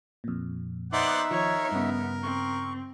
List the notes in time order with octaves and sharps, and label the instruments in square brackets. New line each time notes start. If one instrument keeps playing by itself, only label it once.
[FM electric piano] F2 A#2
[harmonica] B3 D5 F#5 [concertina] D#4 E5 [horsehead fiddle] C5
[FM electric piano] D#3 F3 [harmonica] A#4 [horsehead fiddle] C#5
[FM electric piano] G2 C#3 [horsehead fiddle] B3
[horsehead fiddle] C4 [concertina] C#6